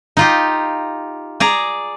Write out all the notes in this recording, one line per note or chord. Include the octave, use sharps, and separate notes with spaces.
D#4 F4 G4
G#4 D5 A#5